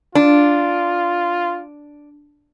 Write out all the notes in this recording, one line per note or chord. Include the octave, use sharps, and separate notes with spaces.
D4 F4